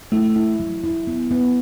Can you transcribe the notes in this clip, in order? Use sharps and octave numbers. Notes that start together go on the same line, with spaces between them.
A3 E4
E4
F#3
E4
B3
B3